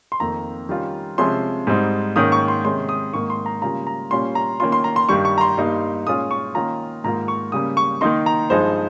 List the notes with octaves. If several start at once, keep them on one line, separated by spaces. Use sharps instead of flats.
C6
F2 D#3 A#3 A#5
D#3 G3 C#4 F4
C3 F3 G#3 C#4 C6
G#2 G3 C4 D#4
G#2 D#3 A#3 C#4 D#6
C#6
C6
C3 D#3 G#3 C#4 C6
D#6
G#2 D#3 A#3 C#6
C6
A#5
C#3 G3 A#3 F4 A#5
A#5
A#2 G3 C#4 F4 C6
A#5
D#3 A#3 C#4 F4 C6
C6
A#5
C6
G2 D#3 G3 C#6
C#6
A#5
C6
G2 G3 A#3 D#4
A#2 G#3 C#4 F4 D#6
C#6
D#3 A#3 C#4 F4 A#5
G#2 D#3 A#3 F4 A#5
C#6
C#3 G3 A#3 D#6
C#6
D#3 A#3 D#4 C6
A#5
G2 F3 G#3 D#4 C5